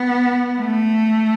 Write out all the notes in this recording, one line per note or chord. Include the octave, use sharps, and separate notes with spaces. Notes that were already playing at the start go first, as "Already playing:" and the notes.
Already playing: B3
A3